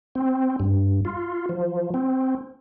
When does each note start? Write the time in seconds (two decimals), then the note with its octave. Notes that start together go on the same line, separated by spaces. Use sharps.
0.15 C4
0.60 G2
1.05 F4
1.49 F3
1.94 C4